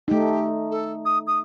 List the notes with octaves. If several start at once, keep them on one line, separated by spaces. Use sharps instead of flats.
A3 D#4 G4
A4
D#6
D#6